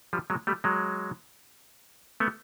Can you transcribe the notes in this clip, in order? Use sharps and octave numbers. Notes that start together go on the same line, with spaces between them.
F3 G3
F#3 G#3
G3 A3
F#3 G#3
A3 B3